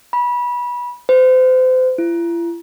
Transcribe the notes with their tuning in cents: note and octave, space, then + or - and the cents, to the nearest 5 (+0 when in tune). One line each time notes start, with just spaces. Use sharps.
B5 -25
C5 -35
E4 +45